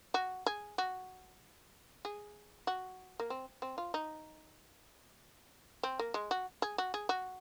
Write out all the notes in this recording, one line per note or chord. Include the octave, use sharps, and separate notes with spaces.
F#4
G#4
F#4
G#4
F#4
A#3
C4
C4
F4
D#4
C4
A#3
G#3
F#4
G#4
F#4
G#4
F#4